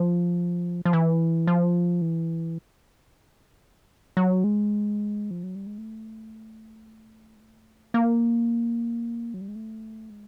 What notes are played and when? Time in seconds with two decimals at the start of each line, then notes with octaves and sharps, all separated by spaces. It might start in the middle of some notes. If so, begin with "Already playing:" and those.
Already playing: F3
0.85 F3
0.93 E3
1.47 F3
2.02 E3
4.17 F#3
4.44 G#3
5.31 F3
5.43 F#3
5.55 G3
5.67 G#3
5.78 A3
7.36 G#3
7.40 A3
7.94 A#3
9.34 F#3
9.41 G3
9.48 G#3
9.56 A3
10.10 G#3